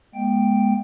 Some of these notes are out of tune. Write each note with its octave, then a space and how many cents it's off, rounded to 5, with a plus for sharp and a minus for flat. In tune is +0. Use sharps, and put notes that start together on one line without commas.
G#3 +0 B3 -40 G5 +0